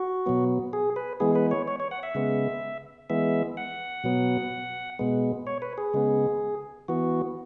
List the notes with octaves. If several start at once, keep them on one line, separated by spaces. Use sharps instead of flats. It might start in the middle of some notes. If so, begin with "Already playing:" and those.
Already playing: F#4
B2 F#3 B3
G#4
B4
E3 G#3 B3 G#4
B4
C#5
C#5
C#5
F#5
E5
C#3 G#3 B3
E3 G#3 B3 E5
F#5
B2 F#3 B3
B2 G#3 B3
C#5
B4
G#4
C#3 G#3 B3
E3 B3 F#4